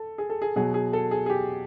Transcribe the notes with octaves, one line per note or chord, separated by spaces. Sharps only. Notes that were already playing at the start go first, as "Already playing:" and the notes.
Already playing: A4
G#4
A4
G#4
B2 F#3 G#4
G#4
A4
G#4
G#4
G4